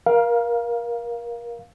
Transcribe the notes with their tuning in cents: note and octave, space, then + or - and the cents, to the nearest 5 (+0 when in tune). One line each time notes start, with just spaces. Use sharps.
A#4 +25 F5 +0